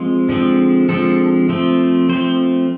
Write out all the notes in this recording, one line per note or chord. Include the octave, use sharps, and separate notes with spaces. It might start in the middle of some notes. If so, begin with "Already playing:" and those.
Already playing: F3 G#3 C4
D3 F3 G#3 C4
D3 F3 G#3 C4 A4
F3 A3 C4
F3 A3 C4 C5